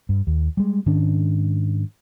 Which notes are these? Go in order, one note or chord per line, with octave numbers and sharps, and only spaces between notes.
G2
D#2
G3 G#3
G#2 D#3 C#4 D4